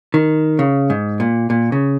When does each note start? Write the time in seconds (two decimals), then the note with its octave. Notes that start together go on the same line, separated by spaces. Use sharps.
0.14 D#3
0.59 C#3
0.90 G#2
1.20 A#2
1.50 A#2
1.72 C#3